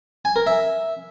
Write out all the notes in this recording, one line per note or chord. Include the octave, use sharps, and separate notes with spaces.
G#5
A#4
E5